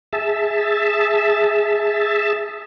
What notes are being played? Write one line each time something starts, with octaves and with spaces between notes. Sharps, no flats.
G#4 E5 A5